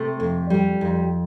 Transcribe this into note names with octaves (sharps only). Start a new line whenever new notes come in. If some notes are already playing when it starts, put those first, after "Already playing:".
Already playing: C3 A3 A4
F2
G3
F2